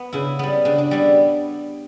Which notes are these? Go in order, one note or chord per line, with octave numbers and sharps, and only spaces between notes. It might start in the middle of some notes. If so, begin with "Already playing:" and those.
Already playing: B3
C#3 E4
G3 B3
C#3 D4
D4
G3 B3 E4